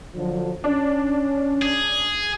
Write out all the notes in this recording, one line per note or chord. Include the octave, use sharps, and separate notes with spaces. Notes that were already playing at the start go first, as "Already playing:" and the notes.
D3 F3 F#3
C#4 D4
G#4